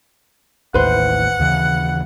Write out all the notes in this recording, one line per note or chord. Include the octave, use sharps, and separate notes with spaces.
A1 D#2 A2 B4 C5 F#5
D#2 C#3 E3